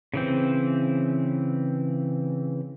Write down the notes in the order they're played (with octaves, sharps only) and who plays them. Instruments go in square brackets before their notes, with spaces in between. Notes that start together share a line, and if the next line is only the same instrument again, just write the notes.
[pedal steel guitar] C#3 E3 C4